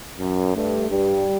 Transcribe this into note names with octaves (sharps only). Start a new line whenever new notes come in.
F#2
G2 A3
G2 G3